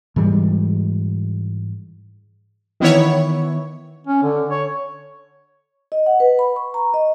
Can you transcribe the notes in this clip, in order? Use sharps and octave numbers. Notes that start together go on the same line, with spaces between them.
G#2 E3 G3 G#3
D#3 E3 B3 E4 C#5
C#4
D3
C#5
D#5
F#5
B4
B5
C#6
A#5
D#5